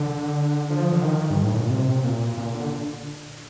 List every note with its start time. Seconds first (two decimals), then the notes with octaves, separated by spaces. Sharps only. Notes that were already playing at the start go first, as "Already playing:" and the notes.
Already playing: D3
0.70 F3
0.93 D3
1.03 D#3
1.30 G2
1.44 A2
1.57 A#2
1.70 C3
2.04 A#2
2.37 A#2
2.54 D3